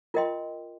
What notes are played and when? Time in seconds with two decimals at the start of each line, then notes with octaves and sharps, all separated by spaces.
0.14 F4 A#4 D#5 G5 C6